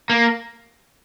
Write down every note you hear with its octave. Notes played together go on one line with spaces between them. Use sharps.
A#3